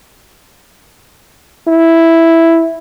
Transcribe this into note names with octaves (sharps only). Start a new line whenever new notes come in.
E4